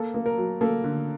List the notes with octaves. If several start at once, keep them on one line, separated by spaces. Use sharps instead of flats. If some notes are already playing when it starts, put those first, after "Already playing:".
Already playing: A#3 A4
A#3
A#4
F#3
A#3 A4
D3